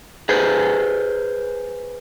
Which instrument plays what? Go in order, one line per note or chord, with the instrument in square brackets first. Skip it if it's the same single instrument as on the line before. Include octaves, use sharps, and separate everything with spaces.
[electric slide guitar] G#4 B4 C5 G#5